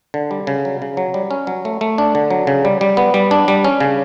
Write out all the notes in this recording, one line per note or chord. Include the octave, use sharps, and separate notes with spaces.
D3
G3
C#3
F#3
C#3
F#3
G3
C#4
F#3
A3
A3
D4
D3
F#3
C#3
G3
G3
B3
G3
D4
G3
C#4
C#3